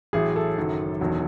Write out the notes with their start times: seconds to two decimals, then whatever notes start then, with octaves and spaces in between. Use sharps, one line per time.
0.13 A1 A2 F#3 G#4
0.36 A4
0.57 F#1 F#2 D#3 F#3
1.01 E1 E2 D#3 F#3